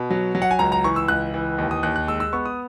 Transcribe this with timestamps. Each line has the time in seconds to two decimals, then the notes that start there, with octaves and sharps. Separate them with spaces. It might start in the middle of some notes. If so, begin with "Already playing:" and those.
Already playing: B2
0.10 F#3
0.35 F#3
0.42 F#5
0.51 G#5
0.59 C#2 A#5
0.72 A#5
0.84 E3 C#6
0.96 E6
1.08 C#2 F#6
1.34 E3
1.58 D#2
1.71 D#6
1.83 D#2 F#6
1.96 F#6
2.07 G#3 E6
2.20 E6
2.33 B3 C#6
2.45 D#6